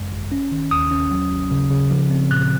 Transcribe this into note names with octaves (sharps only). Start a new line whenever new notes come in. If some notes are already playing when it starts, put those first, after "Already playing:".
Already playing: G#1 F#2 G#3
G#1
C#4
D#3
D#2 D#6
C#4
F#3
G#1
C#3
C#3
F3
C4
A#2 F#6